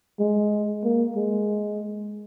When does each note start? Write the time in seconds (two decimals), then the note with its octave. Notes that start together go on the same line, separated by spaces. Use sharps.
0.20 G#3
0.84 A#3
1.16 G#3